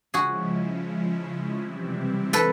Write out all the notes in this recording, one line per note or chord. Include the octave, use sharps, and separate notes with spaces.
C#3 F3 G#3 C#4 E4 F#4 G#4
C3 E3 G3 C4 E4
A4 B4